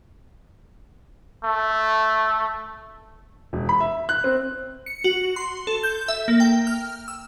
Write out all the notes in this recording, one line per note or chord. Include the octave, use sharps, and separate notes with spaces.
A3
E1
B5
E5
F#6
C4
C#7
F#4
C6
A4
G6
E5
A#3
G5
F6
E6